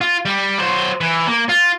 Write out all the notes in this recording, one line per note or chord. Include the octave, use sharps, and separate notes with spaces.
F4
G3
F#3 C5
E3
A#3
F4